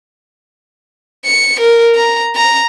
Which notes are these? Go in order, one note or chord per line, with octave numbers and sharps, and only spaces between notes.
C#7
A#4
A#5
A#5